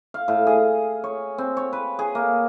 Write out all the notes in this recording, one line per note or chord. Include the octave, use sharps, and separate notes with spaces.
F5
A2
G#4
C#5
C4
C#5
B4
G#4
A#3